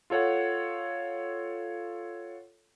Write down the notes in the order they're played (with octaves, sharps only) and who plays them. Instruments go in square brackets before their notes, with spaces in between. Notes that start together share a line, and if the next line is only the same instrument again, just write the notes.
[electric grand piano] F4 A4 C#5 F#5